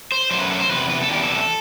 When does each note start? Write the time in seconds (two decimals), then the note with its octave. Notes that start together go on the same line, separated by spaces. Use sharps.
0.12 C5
0.31 F#2 F#3 A3 C5
0.40 B4
0.50 A4
0.60 C5
0.70 E2 C3 B4
0.89 B4
1.00 A4
1.08 E2 C3 E3 G3 G4
1.22 A4